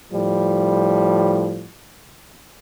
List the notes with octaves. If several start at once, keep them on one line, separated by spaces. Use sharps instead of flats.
A2 F3 G3